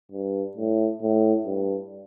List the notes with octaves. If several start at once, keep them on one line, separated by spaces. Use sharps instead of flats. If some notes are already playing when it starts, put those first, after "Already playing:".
G2
A2
A2
G2